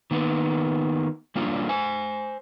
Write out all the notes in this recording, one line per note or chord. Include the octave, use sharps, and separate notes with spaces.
D#3 A#3 B3
G3 A#3 C#4 D4 F4
C5 G#5